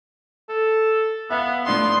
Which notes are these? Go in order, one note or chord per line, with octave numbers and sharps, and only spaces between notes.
A4
B3 E5 F5
A2 F3 D4 C6 D#6